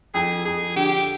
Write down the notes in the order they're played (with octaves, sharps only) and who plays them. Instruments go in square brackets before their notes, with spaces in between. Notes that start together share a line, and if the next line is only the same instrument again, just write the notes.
[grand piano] F2 [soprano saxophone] G#4
[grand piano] F2 [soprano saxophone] G#4
[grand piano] D3 [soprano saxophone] G4